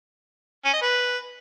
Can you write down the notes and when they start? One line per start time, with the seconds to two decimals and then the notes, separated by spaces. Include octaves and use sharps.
0.65 C#4
0.74 D#5
0.82 B4